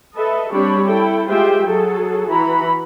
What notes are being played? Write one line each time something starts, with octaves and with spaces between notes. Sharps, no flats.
A4 B4 D#5 E5
G3 C4 D4 G4 C#5 B5
E4 A4 G5
G#3 F4 G4 C5 E5 G5
F#3 G#4 A4
E3 E4 F#4 A#5 B5